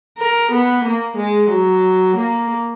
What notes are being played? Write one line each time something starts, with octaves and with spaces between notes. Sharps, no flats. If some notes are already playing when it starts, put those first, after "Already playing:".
A#4
B3
A#3
G#3
F#3
A#3